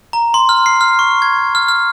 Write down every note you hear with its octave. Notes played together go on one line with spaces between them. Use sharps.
A#5
C6
F6
C7
F6
C#6
G#6
F6
F6